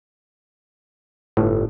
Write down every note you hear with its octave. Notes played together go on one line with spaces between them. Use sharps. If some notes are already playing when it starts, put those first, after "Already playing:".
G1 A2